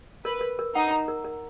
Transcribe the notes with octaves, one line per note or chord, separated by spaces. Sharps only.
A#4 B4
A#4
A#4
D#4 F#5
A#5
A#4
A#4